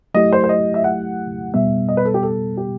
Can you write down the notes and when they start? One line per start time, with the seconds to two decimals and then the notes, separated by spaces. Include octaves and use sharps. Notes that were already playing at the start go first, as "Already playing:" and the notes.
0.14 F#3 A3 E4 G4 D#5
0.33 C5
0.44 C5
0.49 D#5
0.74 E5
0.84 F#5
1.54 B2 G3 B3 E5
1.89 D#5
1.97 B4
2.05 A4
2.14 G4
2.23 A4
2.57 G4